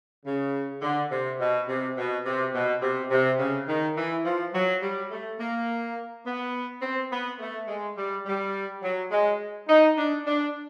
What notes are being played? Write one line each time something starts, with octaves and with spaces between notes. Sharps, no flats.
C#3
D3
C3
B2
C3
B2
C3
B2
C3
C3
C#3
D#3
E3
F3
F#3
G3
A3
A#3
B3
C4
B3
A3
G#3
G3
G3
F#3
G#3
D#4
D4
D4